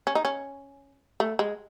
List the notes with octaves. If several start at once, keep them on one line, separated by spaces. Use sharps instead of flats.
C#4
D#4
C#4
A3
G#3